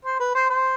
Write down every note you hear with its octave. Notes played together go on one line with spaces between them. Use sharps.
C5
B4
C5
C5